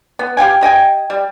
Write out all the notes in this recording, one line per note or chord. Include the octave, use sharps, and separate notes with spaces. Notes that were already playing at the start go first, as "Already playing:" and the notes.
B3
G4 F5 G5 G#5
G4 D#5 G5 G#5
G3